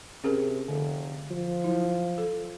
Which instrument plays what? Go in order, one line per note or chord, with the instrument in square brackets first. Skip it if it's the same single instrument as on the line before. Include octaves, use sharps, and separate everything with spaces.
[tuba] C3 [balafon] C#4 G#4 A#4
[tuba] F1 [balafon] D3
[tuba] F3
[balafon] F#3 E4
A4